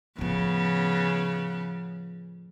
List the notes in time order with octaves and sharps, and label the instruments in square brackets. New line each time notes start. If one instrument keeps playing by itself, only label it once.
[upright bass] A2 F3 [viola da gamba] C#3 B3